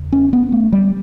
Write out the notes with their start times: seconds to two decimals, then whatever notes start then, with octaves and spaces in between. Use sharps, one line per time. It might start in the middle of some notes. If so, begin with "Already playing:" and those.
Already playing: E2 C#3
0.12 C#4
0.33 B3
0.52 A3
0.72 G3